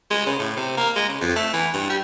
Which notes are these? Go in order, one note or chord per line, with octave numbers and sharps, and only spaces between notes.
G#3
C#3
A2
C3
A#3
G#3
C#3
F2
A3
E3
G2
G3